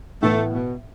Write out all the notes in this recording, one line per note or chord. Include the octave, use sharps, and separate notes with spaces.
A2 E3 A3 B3
B2